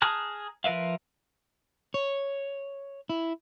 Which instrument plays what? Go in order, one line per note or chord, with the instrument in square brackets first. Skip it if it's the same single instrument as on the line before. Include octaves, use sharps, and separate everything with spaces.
[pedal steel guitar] G#4 A5 A#5 F6 F#6
F3 A#4 B4 E5 F5
[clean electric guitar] C#5
E4